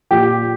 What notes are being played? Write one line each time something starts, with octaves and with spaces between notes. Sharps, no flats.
A#2 F3 G4